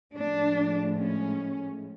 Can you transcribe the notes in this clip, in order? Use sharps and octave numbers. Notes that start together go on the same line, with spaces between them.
A2 F3 G#3 D4
C#4